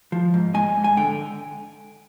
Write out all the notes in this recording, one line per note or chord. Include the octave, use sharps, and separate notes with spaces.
F3
G#2
G#3 G#5
G#2
G#5
D3 G5